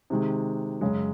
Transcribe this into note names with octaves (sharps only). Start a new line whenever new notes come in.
C3 D#3 G#3
F#2 C#3 G#3